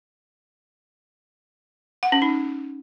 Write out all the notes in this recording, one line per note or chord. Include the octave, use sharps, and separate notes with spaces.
F#5
C#4
D#4